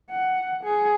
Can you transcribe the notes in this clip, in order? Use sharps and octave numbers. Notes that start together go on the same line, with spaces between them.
F#5
G#4